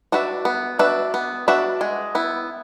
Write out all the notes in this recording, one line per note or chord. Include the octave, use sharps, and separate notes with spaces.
D4 F#4 B4 E5
B3
D4 F#4 B4 E5
B3
D4 F#4 B4 E5
G#3
B3 E4